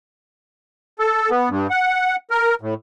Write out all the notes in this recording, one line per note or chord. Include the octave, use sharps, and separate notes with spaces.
A4
B3
G2
F#5
A#4
A2